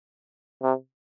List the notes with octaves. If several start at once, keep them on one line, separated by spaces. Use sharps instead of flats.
C3